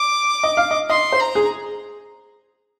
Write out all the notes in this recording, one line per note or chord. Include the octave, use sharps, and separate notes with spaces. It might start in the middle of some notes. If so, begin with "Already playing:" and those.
Already playing: D6
D#5
F5
D#5
D#5 C6
C5
A#5
G#4